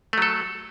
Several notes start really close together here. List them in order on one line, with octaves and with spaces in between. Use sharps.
A3 F#3 A4